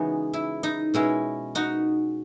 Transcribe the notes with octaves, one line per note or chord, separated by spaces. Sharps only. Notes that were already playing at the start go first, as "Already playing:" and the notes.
Already playing: C#3 E3 G#3 B3 D#4 F#4
E4
D#4
B2 G#3 C#4 E4
D#4 F#4